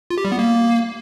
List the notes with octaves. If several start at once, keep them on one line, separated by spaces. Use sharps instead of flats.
F4
G4
G3
B3
A#3